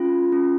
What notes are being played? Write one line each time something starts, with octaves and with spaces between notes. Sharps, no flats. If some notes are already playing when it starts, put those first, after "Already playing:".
Already playing: C#4 F4
C#4